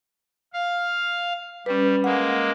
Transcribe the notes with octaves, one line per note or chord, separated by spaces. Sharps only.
F5
G3 C#4 B4
G#3 A#3 F#5